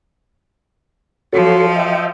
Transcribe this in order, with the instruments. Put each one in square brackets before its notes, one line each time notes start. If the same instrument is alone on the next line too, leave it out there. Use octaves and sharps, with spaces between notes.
[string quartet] F3 [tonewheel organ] F#4 A4 C#5
[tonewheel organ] D#5 E5 G5